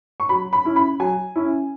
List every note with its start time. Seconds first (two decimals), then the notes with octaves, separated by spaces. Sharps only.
0.20 C#6
0.29 F#3 B5
0.53 B5
0.65 C#4 E4
0.76 B5
1.00 F#3 G#5
1.36 C#4 E4